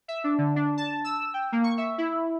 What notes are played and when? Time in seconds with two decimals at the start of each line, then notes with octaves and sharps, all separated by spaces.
0.08 E5
0.24 D4
0.38 D3
0.56 D4
0.77 A5
1.04 E6
1.34 G5
1.52 A#3
1.64 C#6
1.78 E5
1.98 E4